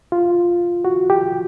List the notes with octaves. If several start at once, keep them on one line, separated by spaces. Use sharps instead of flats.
F4
F#4
G4